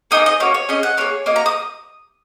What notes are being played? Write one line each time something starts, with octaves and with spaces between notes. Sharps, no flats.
A#3 D#4 G#4 D#6
D#5
A#3 C#4 F#4 C#5
C#5
C#4 G#4 D#5
F#5
A#3 D#4 G#4 C#5
A#3 F#4 D#5
A#5
D#6